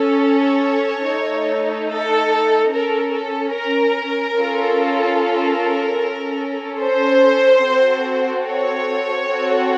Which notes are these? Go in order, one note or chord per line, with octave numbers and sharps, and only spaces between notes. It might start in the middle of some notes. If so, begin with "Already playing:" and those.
Already playing: C#4 A4
C#5
A3 D#4 A4
A4
C#4 A4 A#4
A4
A#4
C#4 F4 A4
A#4
C#4 A4
C5
C4 F#4 A4
C#5
C4 F#4 A4